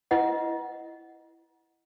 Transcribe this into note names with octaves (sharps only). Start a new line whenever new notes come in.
E4 B4 D#5 F#5